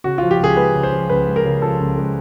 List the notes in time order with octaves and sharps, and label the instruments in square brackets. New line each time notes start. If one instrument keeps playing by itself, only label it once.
[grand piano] C#3 F#4
F4
F3
G4
C#2 G#4
G#3 B4
C#3
C5
F3
C#2 B4
G#3
A#4
C#3
F3 A4
C#2
G#3